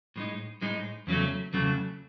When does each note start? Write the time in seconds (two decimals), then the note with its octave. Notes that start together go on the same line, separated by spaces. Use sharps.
0.16 A2 G#3 D#4
0.61 A2 G#3 D#4
1.07 E2 C#3 F#3 A3
1.53 E2 C#3 F#3 A3